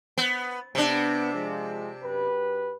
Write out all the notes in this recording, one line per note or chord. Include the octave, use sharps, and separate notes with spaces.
B3
C3 B3 D4
F3 G#3
F#2 G4 B4